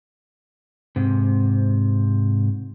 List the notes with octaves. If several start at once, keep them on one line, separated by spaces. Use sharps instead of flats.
G#2 C3